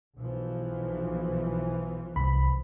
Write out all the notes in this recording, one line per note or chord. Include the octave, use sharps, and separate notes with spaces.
B1 E3 F3
C2 B5